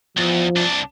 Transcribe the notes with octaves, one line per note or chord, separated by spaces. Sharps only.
E2 F3
C2 D4